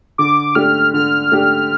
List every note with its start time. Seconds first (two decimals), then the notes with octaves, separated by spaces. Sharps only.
0.18 D3 D6
0.55 A3 D4 G4 F6
0.94 D3 F6
1.32 A3 D4 G4